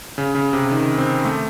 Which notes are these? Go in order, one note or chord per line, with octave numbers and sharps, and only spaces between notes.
C#3
C#3
C3
D#3
C4
A3